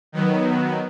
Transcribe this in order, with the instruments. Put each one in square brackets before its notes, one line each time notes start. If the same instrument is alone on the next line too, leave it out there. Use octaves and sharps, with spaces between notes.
[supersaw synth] D#3 F#3 B3